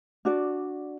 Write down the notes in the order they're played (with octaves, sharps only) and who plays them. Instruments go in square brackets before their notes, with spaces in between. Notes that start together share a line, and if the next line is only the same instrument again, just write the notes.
[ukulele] D4 F#4 D5